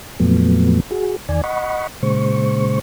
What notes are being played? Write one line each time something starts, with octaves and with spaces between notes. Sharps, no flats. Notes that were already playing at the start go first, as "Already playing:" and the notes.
F2 A#2 F3 F#3 A3 B3
F#4 G#4
E2 D#3 D5 G#5
D#5 F#5 B5 C#6
A#2 C#3 G#3 C5 C#6